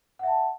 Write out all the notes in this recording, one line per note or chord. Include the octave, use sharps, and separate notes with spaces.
E5 F#5 A5